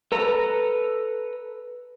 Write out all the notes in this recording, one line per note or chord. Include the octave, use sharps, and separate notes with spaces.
A4 B4 A#5